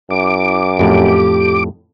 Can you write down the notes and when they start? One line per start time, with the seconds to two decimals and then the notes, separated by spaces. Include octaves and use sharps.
0.11 F#2 E4 D6
0.79 F2 A2 G4